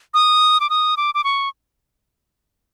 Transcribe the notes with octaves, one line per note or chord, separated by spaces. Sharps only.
D#6
D6
D#6
D6
D6
C#6